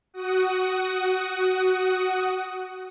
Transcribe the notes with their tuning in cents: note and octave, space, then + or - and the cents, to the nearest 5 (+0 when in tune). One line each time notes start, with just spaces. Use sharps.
F#4 +10 F#5 +15 D#6 +0